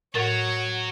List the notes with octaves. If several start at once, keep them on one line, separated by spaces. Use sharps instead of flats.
A2 F#3 F#4 A#4 C#5 A6